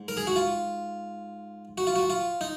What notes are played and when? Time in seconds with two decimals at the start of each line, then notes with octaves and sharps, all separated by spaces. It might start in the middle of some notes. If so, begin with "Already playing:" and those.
Already playing: G#2
0.08 A#4
0.17 G#4
0.27 F#4
0.36 F4
1.78 F#4
1.87 F4
1.96 F#4
2.10 F4
2.41 D#4